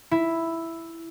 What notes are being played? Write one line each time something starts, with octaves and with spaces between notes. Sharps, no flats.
E4